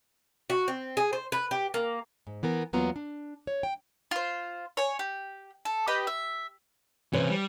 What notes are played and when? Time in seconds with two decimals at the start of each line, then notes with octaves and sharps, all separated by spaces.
0.50 F#4
0.68 C4
0.97 G#4
1.13 C5
1.32 B4
1.51 G4
1.74 A#3
2.27 G#2
2.43 E3 B3 A#4
2.73 E2 F#3 A#3 B3 F4 A#5
2.96 D4
3.47 C#5
3.63 G5
4.11 F4 C5
4.77 C#5 G#5
4.99 G4
5.65 A4
5.87 G4 B4 D#5 G5
6.07 E5
7.13 C3 E3 C#4 C5 C#5
7.29 G3